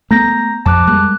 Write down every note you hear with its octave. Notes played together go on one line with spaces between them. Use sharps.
A3 B3 A#5 G6 A#6
F2 A5 D6 F#6
G3 G#3 A#3 F#6